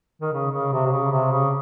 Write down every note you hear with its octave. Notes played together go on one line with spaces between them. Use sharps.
D#3
C#3
C#3
C3
C3
C#3
C3
C#3